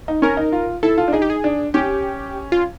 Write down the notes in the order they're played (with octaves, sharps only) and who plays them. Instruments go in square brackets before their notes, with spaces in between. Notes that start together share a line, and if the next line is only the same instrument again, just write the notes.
[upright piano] D#4
[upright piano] C#4 [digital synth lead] A#4
[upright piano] D#4
F4
[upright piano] E4 [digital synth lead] A4
[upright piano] F4
D4
[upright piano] D#4 [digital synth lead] G#4
[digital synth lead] G4
G#4
[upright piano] D4
[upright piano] C#4 [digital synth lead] G4
[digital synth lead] F4